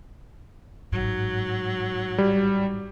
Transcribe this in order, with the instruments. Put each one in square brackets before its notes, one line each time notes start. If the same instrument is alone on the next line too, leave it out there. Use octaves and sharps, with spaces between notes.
[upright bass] A1 G#2 [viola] F#3
[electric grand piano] G3